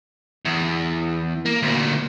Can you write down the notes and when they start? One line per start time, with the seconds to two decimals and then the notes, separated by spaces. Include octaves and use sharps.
0.45 E2
1.46 A#3
1.62 D2 A#2